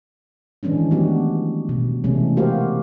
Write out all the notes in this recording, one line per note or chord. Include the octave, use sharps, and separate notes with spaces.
D#3 E3 G#3 C#4 D4
F#3 A3 B3 D4 F#4 G4
B2
C3 E3 G#3 A3 B3 C#4
A#3 F#4 G4 A#4 C5 F5